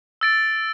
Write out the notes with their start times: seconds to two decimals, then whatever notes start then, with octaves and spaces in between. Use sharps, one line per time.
0.21 E6 A6 D7